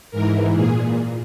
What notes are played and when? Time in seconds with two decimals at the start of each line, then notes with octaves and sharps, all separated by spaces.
0.11 G#2 E3 A#4
0.54 A#2 G#4